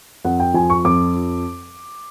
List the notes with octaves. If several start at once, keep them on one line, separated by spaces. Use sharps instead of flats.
F2 F#5
G5
F3 G#5
C#6
F2 D6